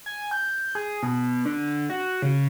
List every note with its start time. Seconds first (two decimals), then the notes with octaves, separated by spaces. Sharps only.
0.06 G#5
0.31 G6
0.75 G#4
1.03 B2
1.45 D3
1.90 F#4
2.22 C#3